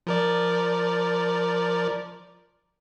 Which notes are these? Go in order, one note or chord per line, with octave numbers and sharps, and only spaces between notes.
F3 A#4 D5